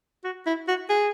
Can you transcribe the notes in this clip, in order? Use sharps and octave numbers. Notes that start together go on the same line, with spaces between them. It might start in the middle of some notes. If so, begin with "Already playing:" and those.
F#4
E4
F#4
G#4